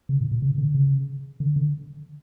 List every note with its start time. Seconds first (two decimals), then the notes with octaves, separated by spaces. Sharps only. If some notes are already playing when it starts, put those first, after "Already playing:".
0.09 C#3
0.21 A2
0.32 A#2
0.42 C#3
0.58 D3
0.74 C#3
1.40 D3
1.56 D3